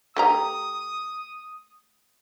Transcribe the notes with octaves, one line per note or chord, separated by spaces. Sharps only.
A3 G4 A#5 D#6